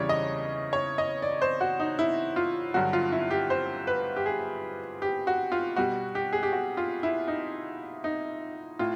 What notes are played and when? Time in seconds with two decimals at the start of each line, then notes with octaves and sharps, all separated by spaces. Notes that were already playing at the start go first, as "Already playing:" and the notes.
Already playing: E2 C#3 E3 G3 C#5 D5
0.09 D#5
0.73 C#5
0.98 D#5
1.22 D5
1.42 C5
1.61 F#4
1.80 D#4
1.99 E4
2.36 F4
2.74 G2 D3 F#3 F#4
2.93 F4
3.12 E4
3.31 G4
3.50 C5
3.87 B4
4.16 G4
4.26 G#4
5.02 G4
5.27 F#4
5.52 F4
5.76 B2 G3 F#4
6.15 G4
6.33 G#4
6.43 G4
6.52 F#4
6.77 F4
7.03 E4
7.28 D#4
8.04 D#4
8.79 A2 F4